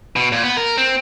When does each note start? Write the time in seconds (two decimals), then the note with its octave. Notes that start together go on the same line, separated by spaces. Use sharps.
0.16 B2
0.32 A#2
0.44 B3
0.57 A#4
0.78 C4